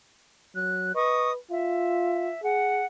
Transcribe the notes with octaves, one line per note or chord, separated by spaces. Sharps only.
F#3 F#6
B4 D#5 C#6 D#6
F4 E5
G#4 F#5